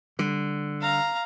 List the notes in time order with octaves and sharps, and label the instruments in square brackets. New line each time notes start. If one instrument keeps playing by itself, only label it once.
[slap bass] D3 [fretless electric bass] G3
[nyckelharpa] F5 A#5